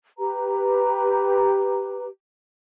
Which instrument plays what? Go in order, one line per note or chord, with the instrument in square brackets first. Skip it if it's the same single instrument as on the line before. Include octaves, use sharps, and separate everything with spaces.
[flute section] G4 B4 A#5